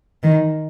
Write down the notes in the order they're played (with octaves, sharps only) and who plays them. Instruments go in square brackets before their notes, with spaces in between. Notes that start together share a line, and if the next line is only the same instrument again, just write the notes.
[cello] D#3